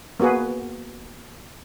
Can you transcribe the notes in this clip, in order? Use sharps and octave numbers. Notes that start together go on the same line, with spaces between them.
A#3 B3 F#4 G#4 B4